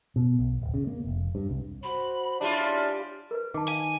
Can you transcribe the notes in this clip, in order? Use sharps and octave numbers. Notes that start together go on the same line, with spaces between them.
B2
B1
D1
C#3
A#3
F1
G2
C2
F#4 C5 B5
C#3 G3 D4 E4 F4
A#4 B4
D#3 A5 D6
F5 G#5